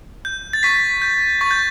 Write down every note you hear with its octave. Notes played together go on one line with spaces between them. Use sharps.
G6
A6
C#6 B6
G6
C#6 A6
G6